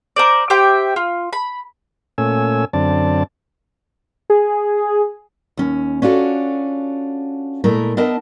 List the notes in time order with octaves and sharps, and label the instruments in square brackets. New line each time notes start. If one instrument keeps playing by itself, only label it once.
[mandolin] A#4 C5 D5
G4 C5 E5 G5
F4
B5
[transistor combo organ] A#2 A3 C#4 G#5 E6
F#2 D3 C4 D5 A5
[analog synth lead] G#4
[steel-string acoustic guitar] D#2 C#4
C#4 D4 F4 F#4 A4
A#2 G#3 A3 E4 A#4
B3 D4 A#4 D#5 E5 A5